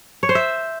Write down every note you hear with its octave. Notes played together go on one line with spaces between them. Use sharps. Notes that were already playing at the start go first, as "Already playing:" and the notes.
C#5
C5
E5